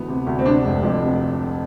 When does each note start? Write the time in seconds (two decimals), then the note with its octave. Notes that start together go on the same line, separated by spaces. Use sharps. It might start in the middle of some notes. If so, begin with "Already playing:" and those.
Already playing: D2 E3 B3
0.08 C3
0.27 D2
0.39 C4
0.46 C3 D4
0.65 F1
0.83 F2
1.02 C3